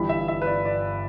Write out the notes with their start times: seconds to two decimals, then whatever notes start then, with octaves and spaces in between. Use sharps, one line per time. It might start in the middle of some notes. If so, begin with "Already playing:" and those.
Already playing: G1 G2 E3 G3 B5
0.09 E5
0.28 E5
0.42 B4
0.47 D5
0.65 D5